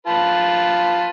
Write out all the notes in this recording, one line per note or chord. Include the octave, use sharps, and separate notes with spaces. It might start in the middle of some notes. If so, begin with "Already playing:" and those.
F4 B4 A5